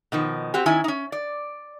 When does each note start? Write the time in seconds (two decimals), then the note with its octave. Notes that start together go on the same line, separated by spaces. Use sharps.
0.12 B2 D#3 F3
0.54 C4 F#4 G4
0.66 D#3 C#4 E4 G#5
0.84 C#4 D#4
1.12 D5